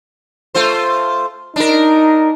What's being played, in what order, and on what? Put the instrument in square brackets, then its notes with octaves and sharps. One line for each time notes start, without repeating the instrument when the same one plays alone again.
[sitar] A3 F4 C5
[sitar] D4 A#4 [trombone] D#4